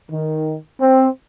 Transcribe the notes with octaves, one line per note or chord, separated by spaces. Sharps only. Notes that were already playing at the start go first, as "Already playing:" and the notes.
D#3
C4